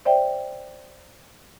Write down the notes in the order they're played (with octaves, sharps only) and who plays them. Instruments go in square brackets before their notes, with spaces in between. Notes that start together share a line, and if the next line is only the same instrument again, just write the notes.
[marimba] C5 D5 E5 G5